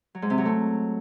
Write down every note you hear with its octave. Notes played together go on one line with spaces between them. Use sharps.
F#3
G#2
C3
F#3
A3